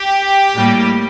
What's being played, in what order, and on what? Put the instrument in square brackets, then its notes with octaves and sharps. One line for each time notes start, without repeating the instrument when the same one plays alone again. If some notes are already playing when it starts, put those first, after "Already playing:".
Already playing: [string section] G4
A2 G3 A#3